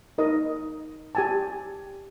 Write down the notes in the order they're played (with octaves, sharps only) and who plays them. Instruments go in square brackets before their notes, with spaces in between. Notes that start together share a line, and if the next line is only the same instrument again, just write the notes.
[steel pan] D#4 A#4 D#5
G4 G#5 A5